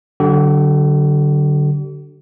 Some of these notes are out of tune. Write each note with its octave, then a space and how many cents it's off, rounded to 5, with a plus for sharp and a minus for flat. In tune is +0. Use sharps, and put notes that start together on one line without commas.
D3 +0 F#3 +30 G4 -45